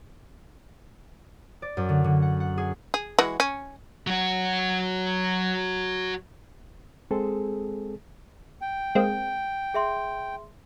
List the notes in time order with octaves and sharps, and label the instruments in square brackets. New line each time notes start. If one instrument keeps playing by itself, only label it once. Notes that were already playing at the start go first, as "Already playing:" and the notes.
[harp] D5
F#2
D3
D3
F#5
F#5
G#4
[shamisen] G#4
E3 G#3 F#4
C#4
[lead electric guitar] F#3 F#4
[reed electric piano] G#3 C4 G#4 A4
[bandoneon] G5
[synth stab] G#3 A#3 C4
[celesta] G#4 E5 C6